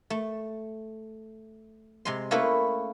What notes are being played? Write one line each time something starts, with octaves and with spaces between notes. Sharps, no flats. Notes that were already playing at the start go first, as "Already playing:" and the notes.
A3
C3 G#3 C6
A3 A#3 C#4 E4 B4